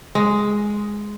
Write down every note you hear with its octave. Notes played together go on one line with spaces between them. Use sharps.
G#3